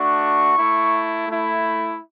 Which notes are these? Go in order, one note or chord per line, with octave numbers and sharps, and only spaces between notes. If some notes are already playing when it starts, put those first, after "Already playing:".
Already playing: A3 D4 F#4 C#6
A3 E4
A3 E4